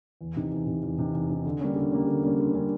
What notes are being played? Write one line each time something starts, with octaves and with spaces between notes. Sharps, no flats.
E2
C3 D#3
E2
C3 D#3
E2
C3 D#3
E2
C3 D#3
D3
G3 A#3 C#4
D3
G3 A#3 C#4
D3
G3 A#3 C#4
D3
G3 A#3 C#4